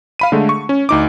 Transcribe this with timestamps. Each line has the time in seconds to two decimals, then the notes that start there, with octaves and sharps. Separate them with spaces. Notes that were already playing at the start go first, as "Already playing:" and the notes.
0.19 F5 B5 D#7
0.32 D3 G#3 A3
0.49 C#6
0.69 C#4
0.89 D2 D#4 D6